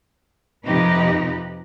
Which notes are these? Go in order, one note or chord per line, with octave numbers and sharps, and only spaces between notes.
F2 C3 F3 D#4 G4 B4